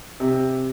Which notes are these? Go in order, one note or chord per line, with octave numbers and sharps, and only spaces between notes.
C3